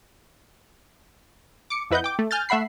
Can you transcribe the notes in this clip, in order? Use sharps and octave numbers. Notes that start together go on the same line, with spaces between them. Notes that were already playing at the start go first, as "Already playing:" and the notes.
D6 C#7
F2 E4 B4 D#5 F#5 G6
G5 D6
A3
G#5 F6 G6 A6
A3 E5 F#5 B5 C7